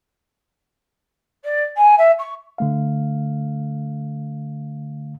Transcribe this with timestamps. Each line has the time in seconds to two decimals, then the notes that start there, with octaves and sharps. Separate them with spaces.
1.44 D5
1.76 G#5
1.98 E5
2.19 C#6
2.58 D3 A3 F5